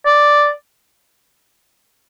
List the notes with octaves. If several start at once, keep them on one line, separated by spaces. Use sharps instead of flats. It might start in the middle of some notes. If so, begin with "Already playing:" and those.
D5